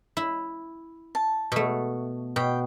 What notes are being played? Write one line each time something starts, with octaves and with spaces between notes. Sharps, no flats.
E4
A5
B2 A3
B2 G5